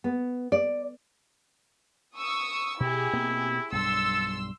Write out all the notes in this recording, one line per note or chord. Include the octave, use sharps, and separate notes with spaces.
B3
D5
C#6 D#6 E6
B2 E4 G4 G#4
B2 A#3 C4
B1 G2 G3 A4 C6 E6